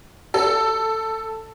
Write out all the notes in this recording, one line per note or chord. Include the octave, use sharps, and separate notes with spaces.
A4